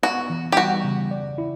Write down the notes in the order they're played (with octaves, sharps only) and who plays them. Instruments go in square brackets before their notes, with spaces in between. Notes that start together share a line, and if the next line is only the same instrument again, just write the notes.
[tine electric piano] B3 [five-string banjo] F#4
[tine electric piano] E3
[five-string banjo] G4
[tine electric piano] G3 [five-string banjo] F#4
[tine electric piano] C#3
D5
E4